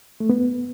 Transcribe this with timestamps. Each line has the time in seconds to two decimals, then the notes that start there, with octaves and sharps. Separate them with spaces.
0.20 A3
0.30 B3